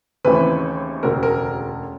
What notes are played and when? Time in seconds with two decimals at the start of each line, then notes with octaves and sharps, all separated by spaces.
0.25 D#2 C#3 E3 A3 C4 B4
1.03 E1 D2 C#3 A#4
1.23 A#4